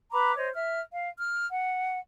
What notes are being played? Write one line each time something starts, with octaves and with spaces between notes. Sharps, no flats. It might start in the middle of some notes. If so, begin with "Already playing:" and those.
B4 A#5 B5 D6
C5 C#5 D#5
E5 F6
F5
F6
F#5